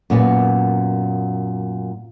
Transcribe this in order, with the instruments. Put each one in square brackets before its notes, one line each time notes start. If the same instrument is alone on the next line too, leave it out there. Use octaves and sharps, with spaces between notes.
[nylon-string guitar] F#2 A#2 B3